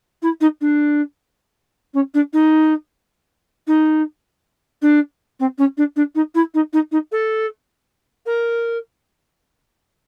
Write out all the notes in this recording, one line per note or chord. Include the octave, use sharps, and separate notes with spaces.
E4
D#4
D4
C#4
D4
D#4
D#4
D4
C4
C#4
D4
D4
D#4
E4
D#4
D#4
D#4
A4
A#4